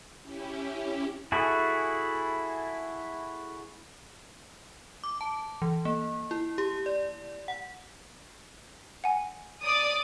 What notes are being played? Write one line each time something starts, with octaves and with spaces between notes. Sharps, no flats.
C#4 E4 G4
E4 F#4 G#4 A4
D6
A5
E3
A#3
E4
G4
D5
F#5
F#5 G#5
D5 D#6